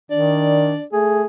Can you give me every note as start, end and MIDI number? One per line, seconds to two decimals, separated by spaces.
0.11 0.76 51
0.11 0.84 62
0.11 0.82 74
0.93 1.24 57
0.93 1.25 68